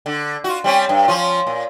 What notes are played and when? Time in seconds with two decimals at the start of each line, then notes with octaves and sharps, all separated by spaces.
0.06 D3
0.44 F4 F#4
0.64 G3 C4 C#4
0.89 G2
1.08 F3 C#4 F4
1.47 A#2